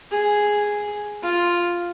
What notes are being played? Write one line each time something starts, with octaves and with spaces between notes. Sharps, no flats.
G#4
F4